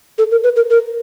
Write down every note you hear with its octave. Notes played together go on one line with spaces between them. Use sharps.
A4
A#4
B4
A#4
A#4